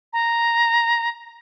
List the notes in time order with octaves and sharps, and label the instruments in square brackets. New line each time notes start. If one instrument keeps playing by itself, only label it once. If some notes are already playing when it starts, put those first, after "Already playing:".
[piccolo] A#5